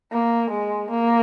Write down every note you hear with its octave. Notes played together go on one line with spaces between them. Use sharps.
A#3
G#3
A#3